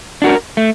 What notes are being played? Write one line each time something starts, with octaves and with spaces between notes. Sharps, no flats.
D4 F#4 A#4
A3